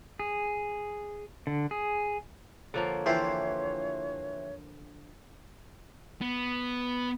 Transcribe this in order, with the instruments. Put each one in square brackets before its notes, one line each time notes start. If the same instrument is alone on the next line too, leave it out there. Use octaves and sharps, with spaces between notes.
[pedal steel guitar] G#4
D3
G#4
[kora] D3 F3 A#3 [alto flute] C#5
[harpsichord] E3 G4 C5 [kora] F3
[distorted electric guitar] B3